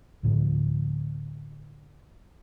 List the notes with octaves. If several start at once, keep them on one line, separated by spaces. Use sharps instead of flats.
D2 A2 D3 F3